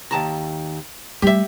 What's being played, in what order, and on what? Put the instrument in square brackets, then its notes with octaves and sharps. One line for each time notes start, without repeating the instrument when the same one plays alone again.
[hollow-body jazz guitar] D#2 A5 A#5
[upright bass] G3 A3 [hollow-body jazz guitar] G4 E5